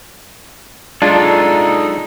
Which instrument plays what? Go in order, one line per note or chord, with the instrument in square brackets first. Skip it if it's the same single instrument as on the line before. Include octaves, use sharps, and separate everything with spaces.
[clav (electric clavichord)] G#3 D4 F4 [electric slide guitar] D#4 A4